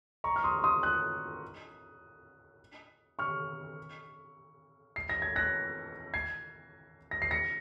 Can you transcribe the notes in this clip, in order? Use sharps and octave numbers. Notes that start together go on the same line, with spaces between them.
A#5 C#6
F6
C6 D#6
C#6
C6 D#6
D#6 F#6
C#6 F6
C7
A#6
G#6
F#6 A#6
G#6 C7
A#6
C7
A#6 C#7